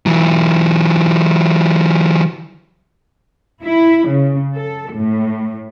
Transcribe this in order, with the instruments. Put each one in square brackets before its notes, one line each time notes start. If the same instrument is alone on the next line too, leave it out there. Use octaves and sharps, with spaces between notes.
[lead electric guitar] E3 F#3
[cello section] E4
C#3
A4
A2